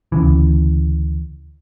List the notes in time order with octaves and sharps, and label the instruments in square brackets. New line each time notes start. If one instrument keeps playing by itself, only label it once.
[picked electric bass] D2 C#3 E3